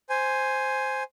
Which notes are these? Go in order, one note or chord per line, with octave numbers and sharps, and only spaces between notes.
C5 G#5